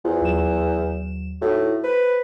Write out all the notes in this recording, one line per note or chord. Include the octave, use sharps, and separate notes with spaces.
E2 F4 C5
D#2 F#3 E7
A2 D#4 E4 F#4
B4 C5